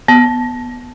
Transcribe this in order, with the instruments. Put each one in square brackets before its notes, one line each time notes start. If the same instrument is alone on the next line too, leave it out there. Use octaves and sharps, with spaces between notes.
[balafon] B3